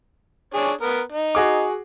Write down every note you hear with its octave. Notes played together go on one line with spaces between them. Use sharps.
D4 G#4 C#5
B3 A#4
D#4
F#4 G#4 D6